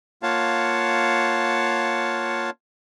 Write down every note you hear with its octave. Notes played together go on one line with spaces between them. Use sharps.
A#3 F4 C#5 F5 F#5 A5